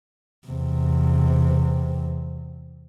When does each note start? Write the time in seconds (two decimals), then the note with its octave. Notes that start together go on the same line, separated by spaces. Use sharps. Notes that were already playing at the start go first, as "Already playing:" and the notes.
0.48 E2 C3